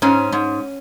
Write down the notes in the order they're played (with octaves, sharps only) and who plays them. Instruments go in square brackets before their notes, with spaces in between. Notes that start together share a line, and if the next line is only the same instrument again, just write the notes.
[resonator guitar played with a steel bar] G#2 C#4
G#2